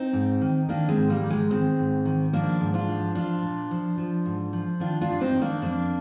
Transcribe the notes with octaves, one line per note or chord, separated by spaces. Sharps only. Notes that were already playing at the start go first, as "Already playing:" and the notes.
Already playing: C4 D#4
G#2
D#3
D#3 A#3 D4
G#3 C4
G#2
G3 A#3
D#3
G#3
D#3 G#3 C4
G#2
D#3
F3 A#3 D4
G#2
D4 F4
F3
F3 D4 F4
A#2
F3
F3
G#2
F3
D#3 D4 F4
D4 F4
G2
C4 D#4
D#3
A#3 D4
F2 A#3 D4